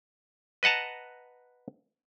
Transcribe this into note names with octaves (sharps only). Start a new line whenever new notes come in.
B4 D#5 F#5 A5 A#5